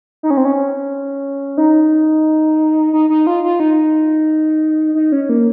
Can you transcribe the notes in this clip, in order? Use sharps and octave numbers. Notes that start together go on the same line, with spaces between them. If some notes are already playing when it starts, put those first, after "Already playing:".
D#4
C#4
C4
C#4
D#4
D#4
D#4
F4
F4
D#4
D#4
C#4
A#3